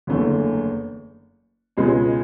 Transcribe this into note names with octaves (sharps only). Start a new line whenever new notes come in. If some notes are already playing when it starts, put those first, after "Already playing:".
F#1 E2 D3 A3
C#2 B2 G#3 C#4